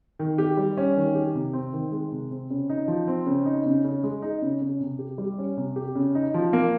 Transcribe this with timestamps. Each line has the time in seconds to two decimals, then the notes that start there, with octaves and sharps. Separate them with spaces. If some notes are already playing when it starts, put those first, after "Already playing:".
0.19 D#3
0.38 G4
0.57 G3
0.77 C#4
0.97 D#3
1.15 G4
1.34 C3
1.53 C4
1.73 D#3
1.92 G#3
2.12 C3
2.31 C4
2.50 C#3
2.70 D#4
2.88 F3
3.08 C4
3.26 C#3
3.46 D#4
3.66 C#3
3.84 C#3
4.03 G#3
4.22 D#4
4.42 C#3
4.61 C#3
4.80 C3
4.99 G4
5.18 G3
5.38 C#4
5.57 C3
5.76 G4
5.95 C#3
6.15 D#4
6.34 F3
6.53 A#3